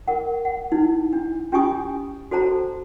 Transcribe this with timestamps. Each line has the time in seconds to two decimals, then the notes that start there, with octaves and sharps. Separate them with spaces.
0.07 A#4 F#5
0.45 F#5
0.72 D#4 E4
1.13 D4
1.52 C#4 F4 G4 G#5 C#6 D#6
2.31 F#4 A4 C5 A5 A#5